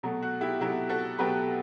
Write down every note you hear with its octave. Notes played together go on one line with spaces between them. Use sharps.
B2 F#3 A3
F#4
E4 G4
B2 F#3 A3 E4 G4
F#4 A4
B2 F#3 A3 G4 B4